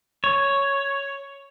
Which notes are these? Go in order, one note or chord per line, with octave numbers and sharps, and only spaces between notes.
C#5